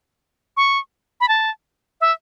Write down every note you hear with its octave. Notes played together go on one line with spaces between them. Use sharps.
C#6
B5
A5
E5